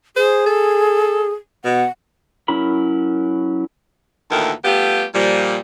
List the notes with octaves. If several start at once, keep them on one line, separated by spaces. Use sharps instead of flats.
G#4 C5
A4
B2 F#5
F#3 C#4 E4 A#4 B5
D2 A#2 D#3 E3 A4 A#4
G3 A3 B3 F4 G4
A#2 F3 G3